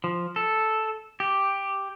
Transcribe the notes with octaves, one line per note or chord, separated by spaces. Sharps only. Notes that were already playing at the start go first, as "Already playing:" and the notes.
F3
A4
G4